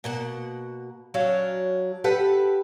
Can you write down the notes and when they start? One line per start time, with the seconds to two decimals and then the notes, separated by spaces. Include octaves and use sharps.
0.04 B2 A#3 F#5
1.14 F#3 C#4 D4 F5
2.04 G4 A4 B4 F#5